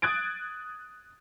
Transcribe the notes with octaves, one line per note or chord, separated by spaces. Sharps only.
D#6 F#6 G#6 A6 D7